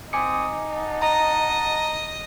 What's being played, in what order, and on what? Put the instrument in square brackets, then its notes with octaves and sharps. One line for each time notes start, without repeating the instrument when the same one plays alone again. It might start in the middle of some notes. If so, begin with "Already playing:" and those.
[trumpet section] C4 D#6 [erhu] D#4 [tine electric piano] G#5 D6 C#7
[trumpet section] F#5 A5
[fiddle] D#5 [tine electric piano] A#5